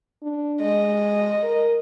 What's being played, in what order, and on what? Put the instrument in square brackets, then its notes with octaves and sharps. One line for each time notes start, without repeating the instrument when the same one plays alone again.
[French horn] D4
[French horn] G#3 [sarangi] D#5
[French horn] A#4